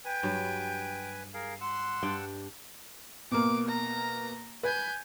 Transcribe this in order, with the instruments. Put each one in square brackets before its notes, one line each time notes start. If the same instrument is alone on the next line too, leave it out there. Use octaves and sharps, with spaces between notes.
[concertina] B4 G#5 [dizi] G5
[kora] G2 F#3
[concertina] G#4 A#4 F5
[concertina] F#5 E6 F#6 [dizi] C6
[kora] G2 D4 G5
[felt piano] B2 A#3 [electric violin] D6
[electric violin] A#5
[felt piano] B4 [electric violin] G#5 G6